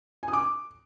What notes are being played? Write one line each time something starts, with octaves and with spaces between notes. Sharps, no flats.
G#5
D#6
D6